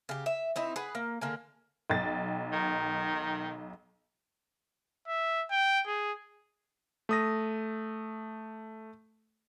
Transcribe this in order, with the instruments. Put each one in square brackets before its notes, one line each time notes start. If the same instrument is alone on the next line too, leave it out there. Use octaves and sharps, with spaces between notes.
[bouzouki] C#3 G4
E5
C4 D#4 E4
G#4 B4 F#5
A#3
D3 A#3 G#4
[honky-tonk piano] B1 G5 A6
[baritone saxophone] D#3
[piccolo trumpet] E5
G5
G#4
[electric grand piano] A3 D#6 A#6